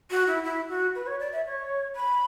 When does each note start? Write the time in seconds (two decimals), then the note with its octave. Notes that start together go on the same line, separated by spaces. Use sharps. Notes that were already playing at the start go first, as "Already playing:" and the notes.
0.11 F#4
0.27 E4
0.43 E4
0.69 F#4
0.95 B4
1.07 C#5
1.20 D5
1.32 E5
1.46 C#5
1.96 B5